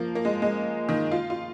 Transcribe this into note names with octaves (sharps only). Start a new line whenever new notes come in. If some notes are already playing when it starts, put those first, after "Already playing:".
Already playing: F3 A#3
A#3
G#3
G#3
D#3
F4
F4